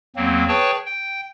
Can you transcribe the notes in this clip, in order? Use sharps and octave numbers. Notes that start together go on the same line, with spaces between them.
E2 F#3 A#3 C4
G#4 B4 C#5 G5 A5 C#6
G5